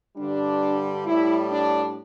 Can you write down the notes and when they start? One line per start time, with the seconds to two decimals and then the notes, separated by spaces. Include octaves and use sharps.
0.16 G2 D3 G3 D4
1.06 A2 G3 E4
1.50 D4